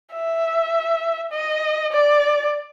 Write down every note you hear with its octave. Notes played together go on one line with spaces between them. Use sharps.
E5
D#5
D5